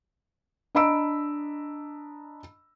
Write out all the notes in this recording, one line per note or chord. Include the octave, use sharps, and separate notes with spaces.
D4 D#5 A#5 B5 E6 D7